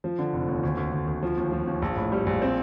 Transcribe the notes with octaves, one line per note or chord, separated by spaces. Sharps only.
F3
D3
F1
D#2
D2
D2
D2
D2
F3
D#2
F3
D#2
A#1
A2
G3
A#1
C4